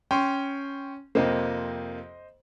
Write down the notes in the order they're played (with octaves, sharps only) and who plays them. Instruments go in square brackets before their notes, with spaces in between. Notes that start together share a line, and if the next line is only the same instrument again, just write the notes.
[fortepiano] C#4 [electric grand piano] G5 C6 C#6
[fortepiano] F2 C3 A#3 [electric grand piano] C5 D#5